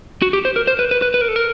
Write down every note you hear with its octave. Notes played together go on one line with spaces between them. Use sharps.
F#4
G4
C5
A#4
C5
B4
B4
B4
B4
A#4
A4
A#4